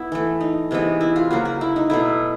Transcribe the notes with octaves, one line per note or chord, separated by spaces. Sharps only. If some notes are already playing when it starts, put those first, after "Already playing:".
Already playing: B3 E4
E3 A3
D#4
C3 E3 G#3 B3
E4
F4
C#3 F#3 A#3 F#4
F#4
E4
D#4
B2 F#3 A3 E4